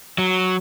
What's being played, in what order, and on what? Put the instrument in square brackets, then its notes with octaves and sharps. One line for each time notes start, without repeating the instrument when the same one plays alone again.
[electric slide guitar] F#3